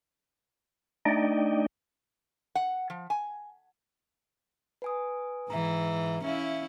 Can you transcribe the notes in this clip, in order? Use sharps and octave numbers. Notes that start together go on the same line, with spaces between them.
A3 D4 D#4 D5 D#5 G5
F#5
F3
G#5
B4 G#5 D#6
G#2 E3 E5 A#5
C#4 E4 E5 F5